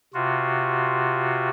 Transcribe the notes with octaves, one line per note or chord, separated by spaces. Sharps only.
C3 F4 F#4